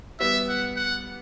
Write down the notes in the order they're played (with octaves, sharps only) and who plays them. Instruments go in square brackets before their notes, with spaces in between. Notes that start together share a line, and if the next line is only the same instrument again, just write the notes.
[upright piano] G3 B3 [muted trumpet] E5
[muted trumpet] F#5
F#5